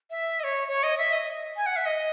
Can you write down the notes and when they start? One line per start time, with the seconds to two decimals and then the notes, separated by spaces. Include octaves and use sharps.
0.11 E5
0.40 D#5
0.44 C#5
0.68 C#5
0.83 D#5
0.98 E5
1.13 D#5
1.56 G#5
1.66 F#5
1.76 E5
1.86 D#5